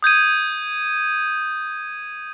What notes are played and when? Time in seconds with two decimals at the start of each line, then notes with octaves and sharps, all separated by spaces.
0.03 D#6 G6 G#6 D#7